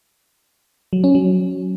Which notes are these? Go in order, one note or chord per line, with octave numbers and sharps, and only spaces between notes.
F#3
C#4
F#3